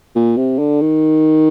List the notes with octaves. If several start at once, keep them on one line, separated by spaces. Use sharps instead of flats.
A#2
C3
D3
D#3